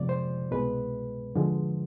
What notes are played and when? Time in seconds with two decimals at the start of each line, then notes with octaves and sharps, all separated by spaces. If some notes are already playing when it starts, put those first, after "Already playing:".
Already playing: F2 C3 F3 G#3 D5
0.09 C5
0.51 C2 B2 G#3 B4
1.35 E2 D3 F3 G#3